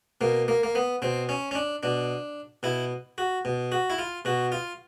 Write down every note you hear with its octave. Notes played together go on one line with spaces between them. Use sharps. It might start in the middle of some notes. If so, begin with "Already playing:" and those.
B2 A#3
A#3
A#3
B3
B2 C4
C#4
C#4
D4
B2 D4
B2 E4
F#4
B2
F#4
E4
F4
B2 F#4
F4